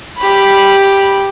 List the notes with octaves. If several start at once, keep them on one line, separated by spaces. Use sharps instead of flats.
G4 B5